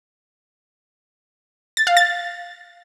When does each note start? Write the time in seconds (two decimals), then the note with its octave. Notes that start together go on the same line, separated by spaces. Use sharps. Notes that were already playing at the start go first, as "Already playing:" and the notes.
1.77 A6
1.87 F5
1.97 A6